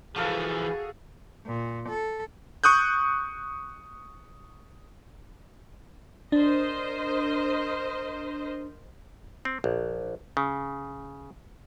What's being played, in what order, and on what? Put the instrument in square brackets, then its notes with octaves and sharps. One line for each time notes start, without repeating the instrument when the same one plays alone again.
[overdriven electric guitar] E3 F3 [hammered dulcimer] F#4 A4 F5 [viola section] G#4
[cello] A#2
A4
[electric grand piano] C#6 D#6 F#6 G6
[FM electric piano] D4 [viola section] A#4 C5 D#5
[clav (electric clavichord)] C4
A#1
C#3